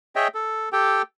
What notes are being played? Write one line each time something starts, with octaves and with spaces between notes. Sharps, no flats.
G#4 C#5 D#5 E5 G5
A4
G4 A4 G5